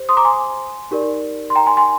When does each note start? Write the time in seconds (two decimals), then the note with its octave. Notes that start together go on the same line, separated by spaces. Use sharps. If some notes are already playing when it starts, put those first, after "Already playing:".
Already playing: G4 C5
0.09 C6 D#6
0.17 A#5 D6
0.25 G#5 C6
0.91 D#4 G4 A#4 D5
1.50 C6
1.56 G5 A#5
1.66 G#5 C6
1.77 G#5 C6